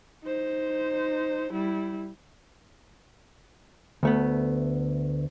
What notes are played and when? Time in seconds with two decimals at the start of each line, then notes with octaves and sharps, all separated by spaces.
0.23 D#4 C5
1.52 G3 E4
4.03 D2 A3 B3